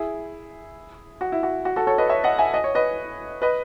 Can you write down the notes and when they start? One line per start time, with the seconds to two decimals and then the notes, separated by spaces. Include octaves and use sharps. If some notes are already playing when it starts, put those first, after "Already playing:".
Already playing: E4 G#4
1.21 F#4
1.32 E4
1.43 F#4
1.65 F#4
1.76 F#4 A4
1.87 A4 C#5
1.98 B4 D#5
2.09 C#5 E5
2.24 D#5 F#5
2.38 E5 G#5
2.54 D#5
2.64 C#5
2.75 B4 D#5
3.42 B4 D#5